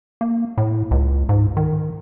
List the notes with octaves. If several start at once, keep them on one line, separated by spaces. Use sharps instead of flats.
A#3
A2
C#2
G#2
D#3